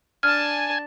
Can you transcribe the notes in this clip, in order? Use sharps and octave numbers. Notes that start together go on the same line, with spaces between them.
D4 G#5 A5 F6